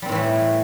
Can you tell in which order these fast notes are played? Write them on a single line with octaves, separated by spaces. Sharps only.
G3 C4 A2 E3 A3